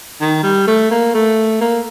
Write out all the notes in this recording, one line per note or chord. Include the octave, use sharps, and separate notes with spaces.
D#3
G3
A3
A#3
A3
A#3